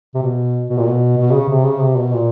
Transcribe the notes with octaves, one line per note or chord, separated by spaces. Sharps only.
C3
B2
B2
A#2
B2
B2
C#3
C3
C#3
C3
B2
A#2